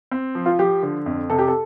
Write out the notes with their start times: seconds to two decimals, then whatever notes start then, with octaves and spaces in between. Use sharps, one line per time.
0.11 C4
0.35 F3
0.46 F4
0.59 F3 G4
0.83 D3
1.06 F2
1.30 C3 A4
1.39 G4
1.48 A4